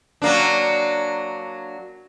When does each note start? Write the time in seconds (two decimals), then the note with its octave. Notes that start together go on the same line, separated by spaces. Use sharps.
0.22 F#3 A#3 D4